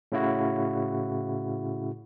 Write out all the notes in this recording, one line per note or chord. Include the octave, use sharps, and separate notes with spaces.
A2 C#3 E4 F#4